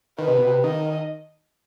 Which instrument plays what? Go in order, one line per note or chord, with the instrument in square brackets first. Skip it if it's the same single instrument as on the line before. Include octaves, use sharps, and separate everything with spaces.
[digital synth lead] D#3 [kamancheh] B4
[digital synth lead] C3
B2
C3
[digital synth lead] D#3 [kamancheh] D#5